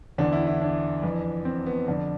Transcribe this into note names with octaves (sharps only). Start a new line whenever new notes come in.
E2 D3 D4
E4
E4
D4
F2 E3
C4
B3
F2 D3 D4